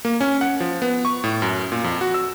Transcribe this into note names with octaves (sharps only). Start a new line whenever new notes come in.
A#3
C#4
F#5
F3
B3
C#6
A2
F#2
A#2
F2
F#4
E6